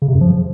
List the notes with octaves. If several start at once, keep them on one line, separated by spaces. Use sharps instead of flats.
C#3
C3
F#2
F3